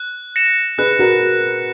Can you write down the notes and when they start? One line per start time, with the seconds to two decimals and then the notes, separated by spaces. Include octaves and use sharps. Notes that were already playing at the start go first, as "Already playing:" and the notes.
Already playing: F#6
0.36 A#6 C#7 E7
0.78 G#4 B4 F#6
0.99 F#4 A#4